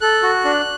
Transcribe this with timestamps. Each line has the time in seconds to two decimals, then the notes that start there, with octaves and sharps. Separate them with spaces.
0.01 A4 F#6
0.23 F#4
0.45 D4